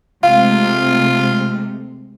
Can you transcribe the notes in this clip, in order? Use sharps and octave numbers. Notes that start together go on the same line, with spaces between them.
C3 G#3 A3 F4 F5